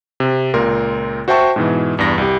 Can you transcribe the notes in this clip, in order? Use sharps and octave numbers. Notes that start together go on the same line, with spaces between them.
C3
C#2 A#2 A#4 C6
F#4 C5 E5 G5 A5 C#6
G#2 B2 E3
E2 G2 A#6
C2 G4